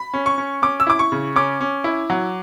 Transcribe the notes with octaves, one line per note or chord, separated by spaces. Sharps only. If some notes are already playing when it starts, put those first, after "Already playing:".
Already playing: B5
C#4
C#6
C#4
C#4 D6
E6
E4 D6
C#6
C#3
C#4 D6
C#4
E4
F#3